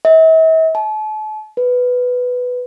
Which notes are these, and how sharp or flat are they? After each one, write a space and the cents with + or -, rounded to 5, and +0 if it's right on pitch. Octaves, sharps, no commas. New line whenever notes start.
E5 -45
A5 -40
B4 +5